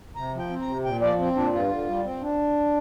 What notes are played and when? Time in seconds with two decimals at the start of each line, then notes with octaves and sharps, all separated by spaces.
0.16 C3 A#5
0.33 F3
0.39 G5
0.50 C4
0.61 A#5
0.67 C3
0.85 A#2 G5
1.01 F3 D5
1.19 C4
1.35 A#2 D4
1.53 G2 F4
1.70 D3
1.88 G3
2.05 C4
2.21 D4